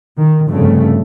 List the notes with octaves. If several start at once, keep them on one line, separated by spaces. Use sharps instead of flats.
D#3
F1 G2 C#3 A3